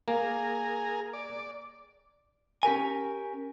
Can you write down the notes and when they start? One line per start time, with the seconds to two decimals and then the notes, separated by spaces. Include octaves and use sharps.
0.08 A#3 G#4 A#4
1.13 D5
2.63 C#4 G4 A#4 G#5